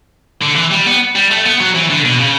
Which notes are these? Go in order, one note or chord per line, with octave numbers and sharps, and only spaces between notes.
D3
E3
G3
B3
G3
A3
B3
F#3
E3
D3
B2
C#3